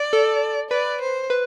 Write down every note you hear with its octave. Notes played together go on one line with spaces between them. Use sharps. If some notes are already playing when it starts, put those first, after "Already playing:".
Already playing: D5
A4
B4 D5
C5
B4